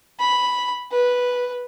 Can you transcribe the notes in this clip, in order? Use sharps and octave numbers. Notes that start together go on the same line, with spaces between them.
B5
B4